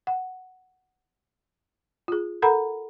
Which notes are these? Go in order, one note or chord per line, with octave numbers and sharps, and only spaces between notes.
F#5
F4 G#4
A4 A#4 F#5 A#5 B5